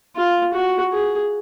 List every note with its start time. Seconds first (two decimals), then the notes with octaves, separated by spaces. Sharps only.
0.16 F4
0.53 F#4
0.92 G#4